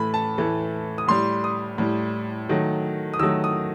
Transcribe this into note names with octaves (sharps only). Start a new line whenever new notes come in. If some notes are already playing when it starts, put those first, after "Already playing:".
Already playing: A2 E3 A3 B5
A5
A2 E3 A3
D#6
A2 G3 C6
D#6
A2 G3
D#3 F#3 A3
D#6
D#3 F#3 A3 E6
D#6